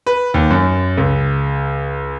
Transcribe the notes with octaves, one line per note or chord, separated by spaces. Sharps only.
B4
D#2
F#2
C#2